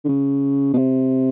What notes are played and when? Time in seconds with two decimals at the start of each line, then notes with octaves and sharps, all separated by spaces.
0.04 D3
0.09 C#3
0.73 B2
0.78 C3